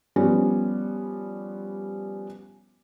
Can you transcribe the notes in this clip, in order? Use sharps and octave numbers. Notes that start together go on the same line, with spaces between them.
F3 G3 B3 C#4